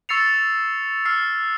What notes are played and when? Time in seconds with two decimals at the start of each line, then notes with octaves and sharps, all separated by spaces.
0.09 C#6 E6 A6 C7 C#7 F7
1.05 E6 F6 C7